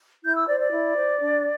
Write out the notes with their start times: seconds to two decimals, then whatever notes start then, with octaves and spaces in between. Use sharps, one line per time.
0.24 E4 G6
0.36 E6
0.48 C5 D5
0.60 D5
0.71 E4
0.95 C5
1.18 D4